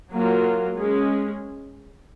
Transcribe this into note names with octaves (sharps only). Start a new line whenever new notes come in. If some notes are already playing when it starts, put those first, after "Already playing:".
F#3 A#3 F4
G#3 C#4 G#4